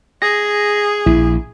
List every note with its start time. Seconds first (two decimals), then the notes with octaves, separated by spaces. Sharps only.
0.22 G#4 A#6
1.06 A#1 E4